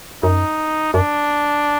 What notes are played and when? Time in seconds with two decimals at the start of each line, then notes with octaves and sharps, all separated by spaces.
0.23 F#2 D#4
0.94 F#2 D4